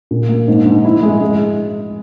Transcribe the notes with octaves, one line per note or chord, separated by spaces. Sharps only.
A#2
A#3
G#2
G#2
E4
G#3
G#3